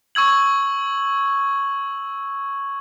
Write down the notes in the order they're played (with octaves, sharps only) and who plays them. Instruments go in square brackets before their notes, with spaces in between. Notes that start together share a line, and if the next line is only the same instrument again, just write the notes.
[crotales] C#6 E6 G#6 F#7